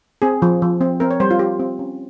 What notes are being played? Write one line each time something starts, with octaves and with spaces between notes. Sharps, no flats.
C4 G#4
F3
F3
C4
C4 A#4
C#5
G3 C5
F4
G3 G4
C4
C#4